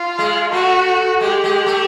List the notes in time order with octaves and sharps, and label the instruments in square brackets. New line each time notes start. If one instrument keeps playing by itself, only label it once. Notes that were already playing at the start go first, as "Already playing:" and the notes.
Already playing: [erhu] F4
[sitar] G#3
[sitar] A3 [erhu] F#4
[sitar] G#3 [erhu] G4
[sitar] G#3
A3